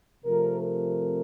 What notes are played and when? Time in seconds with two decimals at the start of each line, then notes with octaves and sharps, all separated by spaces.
0.25 C3 F3 A3 C4 A#4
0.62 A#4